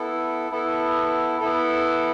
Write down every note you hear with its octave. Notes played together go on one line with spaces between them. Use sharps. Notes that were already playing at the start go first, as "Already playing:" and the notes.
Already playing: B3 E4 A4
B3 E4 A4
B3 E4 A4